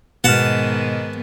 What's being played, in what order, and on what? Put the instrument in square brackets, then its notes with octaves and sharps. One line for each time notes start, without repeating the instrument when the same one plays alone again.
[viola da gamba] G#2 D#3 B3 [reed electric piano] B2 F6 [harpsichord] F#5 A5